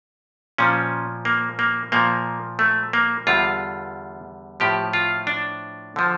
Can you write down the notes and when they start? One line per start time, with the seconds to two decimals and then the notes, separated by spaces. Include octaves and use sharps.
0.58 A#2 F3 C#4
1.25 A#3
1.59 A#3
1.92 A#2 F3 A#3
2.59 A3
2.93 A#3
3.27 E2 D3 G3 F4
4.60 A2 F3 G4
4.93 F4
5.27 D4
5.96 D3 F3